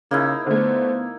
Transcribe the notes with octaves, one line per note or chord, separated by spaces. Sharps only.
C#3 A#3 D#4 E4
D3 A3 B3 C5